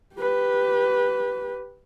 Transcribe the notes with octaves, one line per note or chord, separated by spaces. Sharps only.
G4 B4